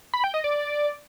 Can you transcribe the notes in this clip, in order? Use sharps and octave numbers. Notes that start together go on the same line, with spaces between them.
B5
G5
D#5
D5